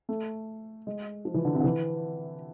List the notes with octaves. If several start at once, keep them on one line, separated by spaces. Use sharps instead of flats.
A3
G#3
F3
E3
D3
C3
D3
E3